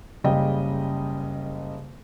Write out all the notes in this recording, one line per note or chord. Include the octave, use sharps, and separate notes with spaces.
F#1 C#3 G3 D#5 G5